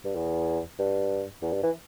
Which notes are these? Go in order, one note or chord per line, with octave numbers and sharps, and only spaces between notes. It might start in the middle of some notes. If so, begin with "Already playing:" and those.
G2
E2
G2
E2
G2
E3